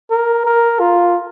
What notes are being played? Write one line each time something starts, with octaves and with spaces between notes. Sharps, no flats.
A#4
A#4
F4